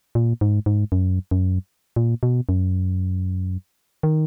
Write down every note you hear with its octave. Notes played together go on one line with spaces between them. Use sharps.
A#2
G#2
G#2
F#2
F#2
A#2
B2
F#2
D#3